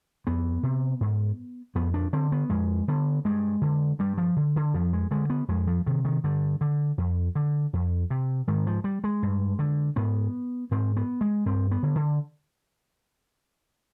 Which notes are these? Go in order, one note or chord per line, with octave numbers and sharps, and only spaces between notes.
F2 B3
C3
G#2
F2 B3
D4
D3 C4
B3
F2 G#3
D3 B3
G2 G#3
D3
G2 G3
F3
D3
D3
F2 F3
G#3
D3 G#3
B3
F2 G#3
F3
C3 D#3
D#3
G2 D3
D3
F2
D3
F2
C3
G#2 D#3
F3
G3
G#3
G2
D3
G#2 B3
G#2 C4
B3
G#3
G2 C4
B3
D3
D3